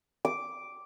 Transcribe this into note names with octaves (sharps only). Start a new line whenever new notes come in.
D6